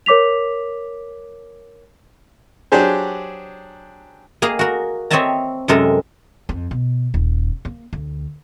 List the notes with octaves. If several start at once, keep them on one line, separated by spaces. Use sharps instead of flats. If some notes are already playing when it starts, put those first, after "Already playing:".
A#4 C#5 D6 B6 F7
F#3 D4 G4 G#4 C5
A#3 G#4 D#5 F5 A#5
F#4 A#4
C4 C#5 D#5 E5 A5 A#5
F#2 C3 G#3 A4 A#4
F2
B2
D#1
A#3
D2